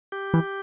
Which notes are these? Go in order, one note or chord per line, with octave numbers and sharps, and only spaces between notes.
G4
E3